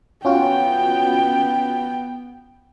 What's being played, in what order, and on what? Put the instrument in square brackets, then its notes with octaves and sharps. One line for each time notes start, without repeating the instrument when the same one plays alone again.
[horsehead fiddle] B3 G5 [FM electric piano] C#4 F4 F#4